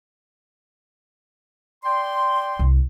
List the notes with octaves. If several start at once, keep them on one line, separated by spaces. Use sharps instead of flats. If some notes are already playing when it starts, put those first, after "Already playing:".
D5 G5 C6
C2